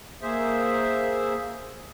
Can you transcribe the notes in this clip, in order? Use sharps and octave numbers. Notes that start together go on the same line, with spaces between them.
A#3 G#4 C5 E5